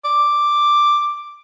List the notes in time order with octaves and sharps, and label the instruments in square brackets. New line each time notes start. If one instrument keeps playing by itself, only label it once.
[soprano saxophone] D6